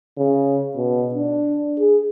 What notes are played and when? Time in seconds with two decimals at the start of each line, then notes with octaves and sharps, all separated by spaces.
0.17 C#3
0.76 B2
1.15 D4
1.79 G#4